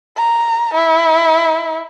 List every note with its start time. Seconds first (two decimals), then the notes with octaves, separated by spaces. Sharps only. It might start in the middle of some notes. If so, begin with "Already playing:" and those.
0.17 A#5
0.74 E4